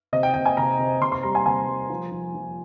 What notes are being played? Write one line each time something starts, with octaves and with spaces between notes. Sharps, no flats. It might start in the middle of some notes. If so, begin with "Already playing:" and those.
C3 D#5
G5
C3 G5
G#5
C3 A#5
C3
C3 C6
C6
G3 A#5
G#5
C3 G#5
G3
F3
F3
F3